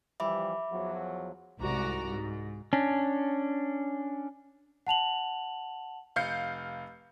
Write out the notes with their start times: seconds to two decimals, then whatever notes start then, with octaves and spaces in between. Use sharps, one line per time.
0.20 E3 F3 G3 E5 B5 D6
0.71 E2 F3 F#3
1.61 C2 G#2 F#4 D5 A#5
2.07 G#2
2.73 C#4 D4
4.87 F#5 A5 F7 F#7
6.16 F1 F5 G6 C7 C#7